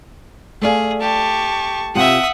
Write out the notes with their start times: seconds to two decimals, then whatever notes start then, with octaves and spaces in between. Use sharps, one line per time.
0.62 A3 G#4 D5 F5
1.01 G4 A5 C#6
1.95 C3 F4 G4 E5 F#5 D#6